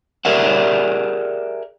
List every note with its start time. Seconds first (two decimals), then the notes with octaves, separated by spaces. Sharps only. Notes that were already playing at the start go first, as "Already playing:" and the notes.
0.25 G4 G#4 A#4 D5 E5 F#5